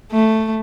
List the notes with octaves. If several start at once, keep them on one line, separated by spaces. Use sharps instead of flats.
A3